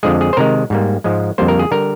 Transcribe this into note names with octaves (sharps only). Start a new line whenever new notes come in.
F2 D3 F3 G#3 G#4
G#4
C5
C3 D#3 G#3 A#4
G#2 G3 A#3
G#2 F3 G#3
F2 D3 G3 A#3 C5
A#4
G#4
D3 G3 A#4